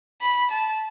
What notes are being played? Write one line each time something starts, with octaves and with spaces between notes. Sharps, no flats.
B5
A5